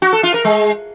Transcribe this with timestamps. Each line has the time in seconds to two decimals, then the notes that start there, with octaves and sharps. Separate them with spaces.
0.02 F#4
0.13 A4
0.23 F4
0.34 A#4
0.45 G#3